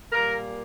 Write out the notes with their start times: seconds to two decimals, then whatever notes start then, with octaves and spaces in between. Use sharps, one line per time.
0.11 A#2 G3 A#3 A#4